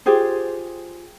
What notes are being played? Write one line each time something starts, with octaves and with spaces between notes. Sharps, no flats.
F4 G4 G#4 C5